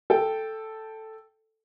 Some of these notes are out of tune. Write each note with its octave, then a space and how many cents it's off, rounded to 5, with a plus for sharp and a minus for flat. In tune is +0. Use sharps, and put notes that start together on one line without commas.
A4 +0 G5 +5